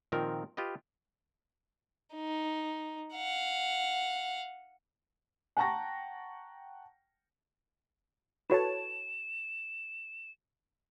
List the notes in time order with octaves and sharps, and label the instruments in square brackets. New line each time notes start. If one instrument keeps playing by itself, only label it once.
[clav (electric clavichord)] A#2 D#3 F3 C4 A#4
F4 G4 B4 D#5
[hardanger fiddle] D#4
F5 F#5
[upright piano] F#5 G5 A5 A#5 C#6 A#6
[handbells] E4 F#4 A4 [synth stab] B4 C#5 A5 [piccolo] E7